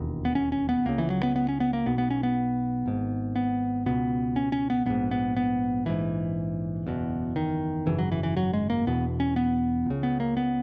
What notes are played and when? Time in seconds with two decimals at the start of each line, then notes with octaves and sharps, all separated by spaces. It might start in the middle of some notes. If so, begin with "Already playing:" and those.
Already playing: E1 D#2
0.25 B3
0.35 C#4
0.52 C#4
0.69 B3
0.85 C#2 C#3 A#3
0.98 E3
1.10 F#3
1.23 B3
1.36 B3
1.49 C#4
1.60 B3
1.73 A#3
1.86 B1 B2 B3
1.98 B3
2.10 C#4
2.23 B3
2.86 G#1 G#2
3.36 B3
3.86 C#2 B2 B3
4.36 C#4
4.52 C#4
4.70 B3
4.86 A#1 G#2 B3
5.11 B3
5.36 B3
5.85 A#1 G#2 E3
6.86 F#1 E2 B2
7.36 D#3
7.86 G#1 F#2 C#3 E3
7.99 F#3
8.12 E3
8.23 E3
8.37 F#3
8.53 G#3
8.70 A#3
8.86 E1 E2 B2 B3
9.20 C#4
9.36 B3
9.86 C#2 C#3
10.03 B3
10.20 A#3
10.37 B3